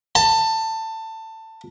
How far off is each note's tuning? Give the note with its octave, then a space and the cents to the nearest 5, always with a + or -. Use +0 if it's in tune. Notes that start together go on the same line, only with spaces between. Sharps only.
A5 +20